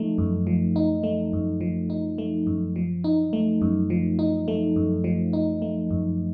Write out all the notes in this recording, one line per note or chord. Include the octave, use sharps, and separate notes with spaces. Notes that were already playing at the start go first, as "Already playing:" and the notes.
Already playing: F3 A3 D#4
F#2
F3
D#4
A3
F#2
F3
D#4
A3
F#2
F3
D#4
A3
F#2
F3
D#4
A3
F#2
F3
D#4
A3
F#2